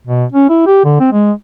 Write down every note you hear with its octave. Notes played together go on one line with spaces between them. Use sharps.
B2
C#4
E4
G4
D3
C4
G#3